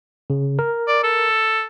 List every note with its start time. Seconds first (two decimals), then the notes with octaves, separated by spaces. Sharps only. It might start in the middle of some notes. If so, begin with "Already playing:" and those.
0.30 C#3
0.59 A#4
0.88 D5
1.04 A4